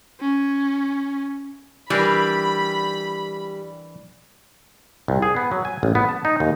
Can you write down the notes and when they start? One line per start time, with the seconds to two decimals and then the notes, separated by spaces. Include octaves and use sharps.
0.21 C#4
1.90 E3 G3 D4 A#4 B5
5.08 C2
5.22 G#4
5.36 B3
5.52 F#3
5.65 G#5
5.83 A1
5.95 B3
6.09 A5
6.25 D#4
6.40 D#2